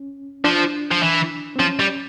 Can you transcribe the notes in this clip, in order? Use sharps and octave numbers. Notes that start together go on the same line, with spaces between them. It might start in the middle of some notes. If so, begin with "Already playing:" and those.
Already playing: C#4
F3 D4
F3
E3
C4
F3 C#4
G3